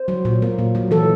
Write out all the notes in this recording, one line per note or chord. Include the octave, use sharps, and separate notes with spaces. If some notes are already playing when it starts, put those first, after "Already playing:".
Already playing: C5
F#3
A#2
A#3
A#2
F#3
E3 A4